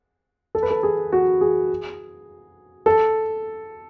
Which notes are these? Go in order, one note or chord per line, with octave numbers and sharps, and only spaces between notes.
A4
B4
A4
G#4
F#4
G#4
A4